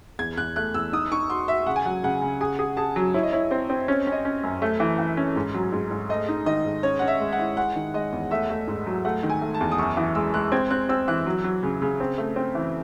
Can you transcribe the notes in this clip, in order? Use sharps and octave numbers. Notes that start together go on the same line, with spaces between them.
E2 G#6
E2 F#6
A3 F#6
E2 E6
D#4 D#6
D#4 C#6
F#4 C6
F#4 E5
C#3 F#5
G#5
F#3 F#5
C#3 F#5
C#3
G#4 G#5
G#4
G#4 A5
F#3
E4 C#5
D#5
E4 C#5
C4 C5
C4
C#4 C#5
C#4
D#5
C#4
F#2
A3
E3
E3
C#4
G#2
F#3
G#2
G#2
A3 D#5
D#4
D#3 D#5
G#2
C#4 C#5
C#4 F#5
E5
G#3
F#5
E4
G#3 F#5
D#3
G#3 D#5
E2
A3 E5
A3
G#2
F#3
A3 F#5
D#3
G#5
A3
A5
E2
D#6
F#2 C#6
E3 D#6
G#3 E6
G#3 F#6
C4 G#6
C4 F#6
C4 E6
E3 F#6
F#3
F#3
C#3
C#3
C4
A3
C4
E3